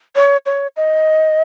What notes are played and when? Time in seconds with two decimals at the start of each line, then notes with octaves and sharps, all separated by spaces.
0.15 C#5
0.46 C#5
0.76 D#5